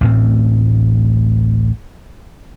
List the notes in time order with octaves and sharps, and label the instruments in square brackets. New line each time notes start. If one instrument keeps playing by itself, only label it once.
[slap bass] A1 D2 A2 C4